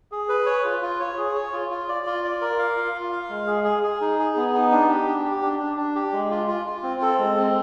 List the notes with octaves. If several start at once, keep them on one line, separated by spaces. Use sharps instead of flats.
G#4
B4
C#5
F4
F4
C#5
G#4
C#5
F4
F4
D5
F4
D5
A#4
F5
F4
F4
F5
G#3
G#4
G#4
G#4
D#4
G#4
B3
D#4
D4
G4
D4
G4
D4
D4
D4
G4
G#3
F4
F4
F4
C4
A4
G#3
C4